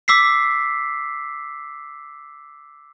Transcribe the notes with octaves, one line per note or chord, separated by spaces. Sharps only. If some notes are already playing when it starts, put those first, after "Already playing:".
D6 E6 B6 C7